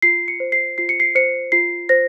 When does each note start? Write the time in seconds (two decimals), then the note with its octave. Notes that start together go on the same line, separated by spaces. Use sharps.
0.02 F4 C7
0.28 C#7
0.40 C5
0.52 C7
0.78 F4 C7
0.89 C#7
1.00 C7
1.15 C5 C#7
1.52 F4 C7
1.89 C5 A#6